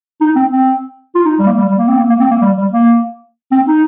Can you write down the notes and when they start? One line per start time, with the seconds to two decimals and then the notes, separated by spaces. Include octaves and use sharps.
0.21 D#4
0.36 C4
0.52 C4
1.15 F4
1.26 D#4
1.39 G3
1.47 A#3
1.57 G3
1.68 G3
1.78 A#3
1.88 C4
1.98 A#3
2.10 A#3
2.20 C4
2.31 A#3
2.42 G3
2.58 G3
2.73 A#3
3.52 C4
3.68 D#4